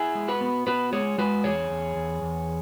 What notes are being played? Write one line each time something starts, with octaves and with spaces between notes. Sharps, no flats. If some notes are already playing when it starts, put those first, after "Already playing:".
Already playing: E4 G#4
G#3
F#4 B4
B3
B3 F#4 B4
G#3 G#4 C#5
G#3 F#4 B4
E2 G#4 C#5
E2
E2
E2